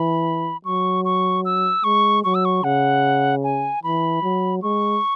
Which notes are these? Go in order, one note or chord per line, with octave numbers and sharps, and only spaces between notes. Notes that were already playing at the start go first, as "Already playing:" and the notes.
Already playing: E3 B5
F#3 C#6
C#6
E6
G#3 C#6
F#3 C#6
E6
C#6
C#3 F#5
G#5
E3 B5
F#3
G#3 C#6